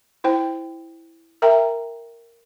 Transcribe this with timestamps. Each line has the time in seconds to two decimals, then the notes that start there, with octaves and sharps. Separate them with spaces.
0.24 E4 C5 G5
1.42 A#4 E5 G5 A#5